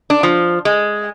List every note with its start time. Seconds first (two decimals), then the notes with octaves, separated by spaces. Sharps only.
0.10 D4
0.23 F3
0.65 G#3